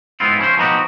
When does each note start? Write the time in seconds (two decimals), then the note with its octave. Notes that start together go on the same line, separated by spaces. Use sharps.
0.20 G#2 B3 C4 E4 F4
0.39 F3 C#4 E4 C5
0.58 F3 B3 D#4 F#4 G4